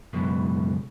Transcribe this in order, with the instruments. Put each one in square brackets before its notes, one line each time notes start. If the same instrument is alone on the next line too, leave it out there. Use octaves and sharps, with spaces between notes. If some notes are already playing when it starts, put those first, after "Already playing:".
[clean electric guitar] C#2 F#2 B2 G#3